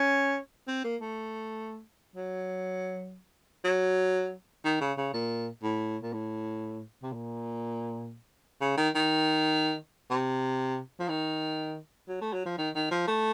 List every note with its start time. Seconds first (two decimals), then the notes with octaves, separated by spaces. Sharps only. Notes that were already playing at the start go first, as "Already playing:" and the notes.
Already playing: C#4
0.68 C4
0.84 A#3
1.01 A3
2.15 F#3
3.64 F#3
4.65 D#3
4.81 C#3
4.98 C#3
5.13 A#2
5.63 A2
6.03 A#2
6.13 A2
7.03 C3
7.13 A#2
8.61 C#3
8.77 D#3
8.95 D#3
10.10 C3
10.99 F3
11.09 D#3
12.08 F#3
12.21 A3
12.33 F#3
12.46 F3
12.58 D#3
12.75 D#3
12.91 F3
13.07 A3